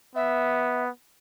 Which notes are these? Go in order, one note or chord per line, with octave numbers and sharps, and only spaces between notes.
B3 E5